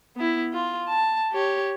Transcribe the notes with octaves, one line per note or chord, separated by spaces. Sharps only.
B3 E4
F4
A5
G4 C#5